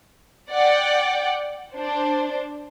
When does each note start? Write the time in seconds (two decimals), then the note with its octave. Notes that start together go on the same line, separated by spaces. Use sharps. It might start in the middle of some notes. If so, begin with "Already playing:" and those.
0.50 D5 F#5 G5
1.74 D4 C5